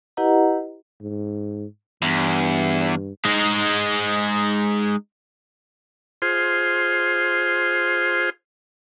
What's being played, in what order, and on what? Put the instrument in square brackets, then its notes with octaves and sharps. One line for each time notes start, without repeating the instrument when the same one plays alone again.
[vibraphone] E4 G4 B4 D#5 F#5 A#5
[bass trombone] G#2
[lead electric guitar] E2 [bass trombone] G2
[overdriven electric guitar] G#3 D#4
[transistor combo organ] F4 G#4 C5